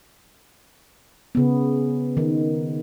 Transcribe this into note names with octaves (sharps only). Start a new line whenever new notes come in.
C#3 B3
D#3